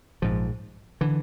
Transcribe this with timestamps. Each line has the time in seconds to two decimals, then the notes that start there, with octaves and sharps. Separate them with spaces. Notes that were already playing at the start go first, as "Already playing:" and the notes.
0.22 A#1 G#2 F3
1.01 D3 E3